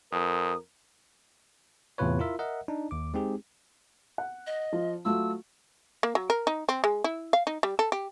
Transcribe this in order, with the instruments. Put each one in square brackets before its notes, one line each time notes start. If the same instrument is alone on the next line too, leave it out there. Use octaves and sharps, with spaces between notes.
[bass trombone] F2 [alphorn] A#4 [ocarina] D#6
[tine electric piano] E2 A2 C3 F4 B4 C#5
E4 F4 A#4 E5
A#4 D#5 E5 F#5
D4 D#4
D#2 D6
G#3 C4 D#4 G4 G#4
[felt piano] F#5
[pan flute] D#5
[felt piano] F3 F4
[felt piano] F#3 A3 F4 [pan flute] E6
[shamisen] A#3
F#3
A#4
D#4
C4
G#3
E4
F5
D#4
G3
A4
G4